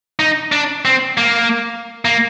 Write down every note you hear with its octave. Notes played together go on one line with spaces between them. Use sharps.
D#4
D4
C4
A#3
A#3